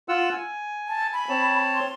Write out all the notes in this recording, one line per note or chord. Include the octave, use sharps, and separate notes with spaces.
F4 F#5 E6
G#5
A5
B5
C4 C#5 A5
C6